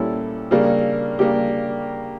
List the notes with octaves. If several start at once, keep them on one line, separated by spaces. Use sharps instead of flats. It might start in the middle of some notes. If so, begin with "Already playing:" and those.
Already playing: A#2 G3 C#4 E4 A4
C#3 G3 A#3 D4
C#3 G3 A#3 D4 G4